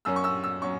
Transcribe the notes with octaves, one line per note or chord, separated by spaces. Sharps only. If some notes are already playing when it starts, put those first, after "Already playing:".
F#2 F#3 C#4 E6
C#6
E6
E6
F#3 C#4 C#6